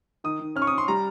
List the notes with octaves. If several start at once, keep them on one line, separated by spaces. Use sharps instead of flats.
D#3 D#6
D#3
C#4 F6
C#6
C#4 D#6
C6
G3 A#5